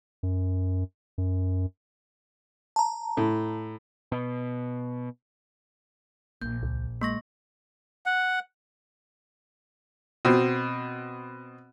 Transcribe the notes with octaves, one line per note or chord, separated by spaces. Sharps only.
F#2
F#2
A5 A#5
A2
B2
A#1 A#3 G6
C#2
G#3 A#3 C#6 A#6
F#5
B2 C4